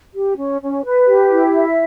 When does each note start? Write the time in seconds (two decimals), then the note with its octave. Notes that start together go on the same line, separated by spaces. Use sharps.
0.14 G4
0.38 C#4
0.61 C#4
0.84 B4
1.07 G4
1.30 E4
1.53 E5